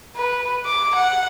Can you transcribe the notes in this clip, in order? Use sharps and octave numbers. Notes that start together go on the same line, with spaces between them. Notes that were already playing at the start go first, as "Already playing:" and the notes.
B4
D6
F#5